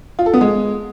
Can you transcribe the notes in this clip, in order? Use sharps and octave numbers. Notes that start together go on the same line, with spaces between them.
F4
A4
B3
G#3